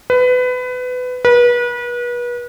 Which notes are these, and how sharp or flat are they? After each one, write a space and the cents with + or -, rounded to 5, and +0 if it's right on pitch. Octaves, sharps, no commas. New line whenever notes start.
B4 +20
B4 -35